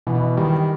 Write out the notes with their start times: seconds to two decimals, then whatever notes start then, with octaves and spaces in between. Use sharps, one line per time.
0.07 B2 E3
0.37 D#3 G3